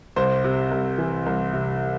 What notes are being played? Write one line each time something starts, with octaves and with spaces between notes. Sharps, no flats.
C2 C5
C3
C2
E3
C2
C3